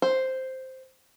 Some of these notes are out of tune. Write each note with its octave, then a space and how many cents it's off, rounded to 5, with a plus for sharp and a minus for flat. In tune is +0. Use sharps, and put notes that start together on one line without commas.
C5 +0